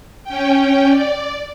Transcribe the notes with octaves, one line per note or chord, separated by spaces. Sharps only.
C#4 G5
D5